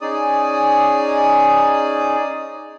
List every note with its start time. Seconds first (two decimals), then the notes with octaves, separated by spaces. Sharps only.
0.01 C#4 D#4 G#4 D5 D#6